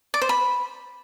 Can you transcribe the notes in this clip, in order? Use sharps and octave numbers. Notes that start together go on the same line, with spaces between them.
D5
C5
B5